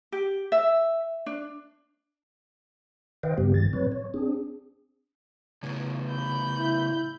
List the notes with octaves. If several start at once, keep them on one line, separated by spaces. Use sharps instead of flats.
G4
E5
D4
D#3 B4 C5 D#5 F5 G5
G2 C#3 G3 B3 G4
G2 D#3 A6
A2 F#3 C4 B4 C#5
C#5
C4 D4 G#4
A2 C#3
B5 G6
E4